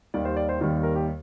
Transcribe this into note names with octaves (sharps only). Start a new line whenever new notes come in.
D#2 D#3 G3 D5
C5
D5
C5
D#2 D#3 G3
A#4
G4